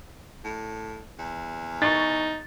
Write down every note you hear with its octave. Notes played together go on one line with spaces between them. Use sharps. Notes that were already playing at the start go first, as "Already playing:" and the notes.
A2
E2
D#4 C#6 A6